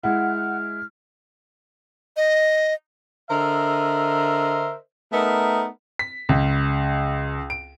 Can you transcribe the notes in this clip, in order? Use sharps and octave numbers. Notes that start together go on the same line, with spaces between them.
G#3 E4 F#5 F6
D#5
D3 A#4 C5 D#5 E5
A3 B3 D#4 A#4
B6
C#2
D7